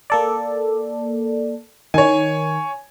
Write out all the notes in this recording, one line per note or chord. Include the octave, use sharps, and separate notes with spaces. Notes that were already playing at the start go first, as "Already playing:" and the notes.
A#3 A4 D5
D#3 C#5 G#5